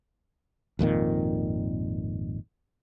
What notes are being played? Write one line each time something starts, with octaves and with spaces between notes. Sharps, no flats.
G#1 F2 A#2 D#3